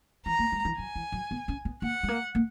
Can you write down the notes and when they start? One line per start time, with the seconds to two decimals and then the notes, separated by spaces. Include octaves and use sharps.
0.26 E3 A#5
0.39 A#3
0.52 G#3
0.65 E3
0.78 F#3 G#5
0.96 E3
1.12 F#3
1.31 B3
1.48 C#4
1.65 B3
1.82 A#3 F#5
2.03 G#3
2.08 A#3
2.35 A#3